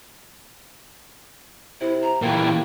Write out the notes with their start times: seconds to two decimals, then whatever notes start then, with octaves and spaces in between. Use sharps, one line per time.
1.81 C3 E4
2.02 A#5
2.22 A#2 E3 A#3 G5